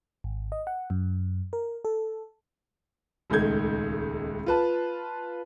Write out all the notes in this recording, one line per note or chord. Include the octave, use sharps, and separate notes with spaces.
G#1
D#5
F#5
F#2
A#4
A4
D#1 C#2 D#3 A3 G6 G#6
F4 B4 A5